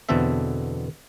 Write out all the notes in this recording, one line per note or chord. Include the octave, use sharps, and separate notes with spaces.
E2 B2 D3 C4 A4 E5